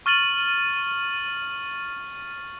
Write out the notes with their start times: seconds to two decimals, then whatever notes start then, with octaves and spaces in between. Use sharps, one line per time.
0.06 C#6 F6 A6 D#7 F#7